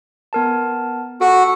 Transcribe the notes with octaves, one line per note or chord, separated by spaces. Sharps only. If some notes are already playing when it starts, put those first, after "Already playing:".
B3 A#4 A5
F#4 A4